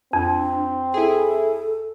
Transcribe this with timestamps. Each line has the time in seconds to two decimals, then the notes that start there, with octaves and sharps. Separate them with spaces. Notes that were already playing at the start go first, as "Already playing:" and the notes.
0.13 F2 C4 D4
0.94 E4 G#4 A4